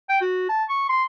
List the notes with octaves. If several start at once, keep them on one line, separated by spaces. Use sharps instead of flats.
G5
F#4
A5
C#6
C6